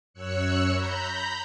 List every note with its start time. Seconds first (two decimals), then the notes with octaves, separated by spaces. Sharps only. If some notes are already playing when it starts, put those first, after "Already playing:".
0.13 F#2 C#5 E6 F#6 C#7
0.71 A#5 B5 G6